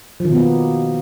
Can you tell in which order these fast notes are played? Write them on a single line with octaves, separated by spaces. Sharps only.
F3 D#3 B2 B3 A#3